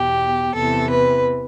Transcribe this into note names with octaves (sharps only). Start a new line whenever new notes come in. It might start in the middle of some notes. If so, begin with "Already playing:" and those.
Already playing: E2 B2 G4
E2 C3 E3 A4
B4